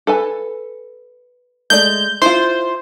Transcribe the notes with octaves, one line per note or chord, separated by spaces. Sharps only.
A4 B4 G#5
G#3 A3 D5 G6
E4 F4 C5